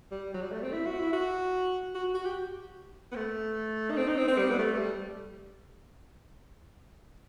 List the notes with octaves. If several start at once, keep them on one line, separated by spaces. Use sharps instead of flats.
G3
F#3
G3
A3
C4
E4
F#4
E4
F#4
F#4
F#4
G4
B3
A3
D#4
C4
D#4
C4
C4
G3
B3
A3
G3